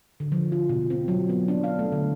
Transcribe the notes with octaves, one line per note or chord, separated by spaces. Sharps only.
D3
F3
F4
B2
C4
F#3
B3
D4
F5
A3
D3